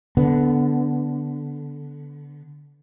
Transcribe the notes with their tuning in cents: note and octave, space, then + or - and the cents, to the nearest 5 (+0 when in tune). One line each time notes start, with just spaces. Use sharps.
D3 -15 B3 +0